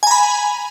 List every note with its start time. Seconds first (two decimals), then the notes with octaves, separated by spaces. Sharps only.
0.03 G#5
0.07 A#5
0.11 B5